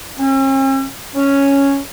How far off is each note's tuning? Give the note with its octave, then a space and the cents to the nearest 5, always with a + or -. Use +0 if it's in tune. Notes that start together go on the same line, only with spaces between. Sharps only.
C#4 -45
C#4 +0